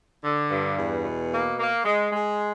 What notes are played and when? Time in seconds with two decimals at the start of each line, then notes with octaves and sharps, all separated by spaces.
0.22 D3
0.49 G2
0.77 E2
1.04 B2
1.31 A#3
1.58 A#3
1.85 G#3
2.12 G#3